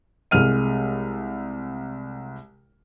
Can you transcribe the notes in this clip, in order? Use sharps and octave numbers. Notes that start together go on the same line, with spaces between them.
C2 G#3 F6 D#7